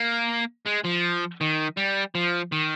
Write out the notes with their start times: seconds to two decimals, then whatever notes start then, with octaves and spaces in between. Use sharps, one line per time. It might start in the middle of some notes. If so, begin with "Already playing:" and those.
Already playing: A#3
0.66 G#3
0.85 F3
1.41 D#3
1.77 G3
2.15 F3
2.52 D#3